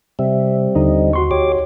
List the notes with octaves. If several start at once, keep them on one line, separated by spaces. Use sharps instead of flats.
C3 G3 C4 E5
D#2 D3 D#4 D#5
F#4 C6 C#6
D2 G4 C#5 D6